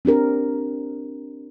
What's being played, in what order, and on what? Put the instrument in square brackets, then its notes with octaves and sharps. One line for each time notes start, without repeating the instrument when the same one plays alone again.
[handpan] C4 D4 G4 A#4